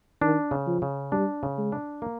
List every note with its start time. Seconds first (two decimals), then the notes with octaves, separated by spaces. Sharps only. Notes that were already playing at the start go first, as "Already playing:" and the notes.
0.22 D#3 D4
0.51 C#3
0.67 F3
0.82 C#3
1.12 G3 D4
1.43 C#3
1.58 G#3
1.72 D4
2.02 A#3